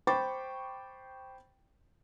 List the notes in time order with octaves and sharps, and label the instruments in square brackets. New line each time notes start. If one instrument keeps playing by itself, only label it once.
[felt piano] C5 G5 B5 C#6 D6 A6